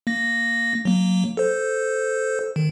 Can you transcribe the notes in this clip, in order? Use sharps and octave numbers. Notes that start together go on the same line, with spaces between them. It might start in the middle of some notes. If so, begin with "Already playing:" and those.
A#3 A#6
F#3 A#3
A4 C5
D#3